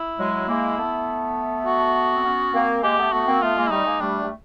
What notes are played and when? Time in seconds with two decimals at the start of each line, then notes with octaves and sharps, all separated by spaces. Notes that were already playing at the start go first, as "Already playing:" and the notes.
Already playing: E4
0.19 F#3 G#3
0.48 G#3 A#3
0.78 A3 B3
1.66 F#4
2.14 C4
2.25 B3 C#4
2.54 A#3 C4
2.82 G#3 A#3 G4
2.98 A3 B3
3.12 A3 B3 F#4
3.27 A#3 C4
3.42 A3 B3 F4
3.56 G#3 A#3
3.67 E4
3.71 G3 A3 D#4
3.85 G#3 A#3
4.00 G3 A3 D4
4.23 G3